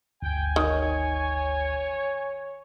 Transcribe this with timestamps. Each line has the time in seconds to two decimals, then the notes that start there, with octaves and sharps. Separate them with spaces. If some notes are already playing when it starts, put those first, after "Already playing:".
0.22 G1 D2 G5 G#5
0.56 D#3 C#5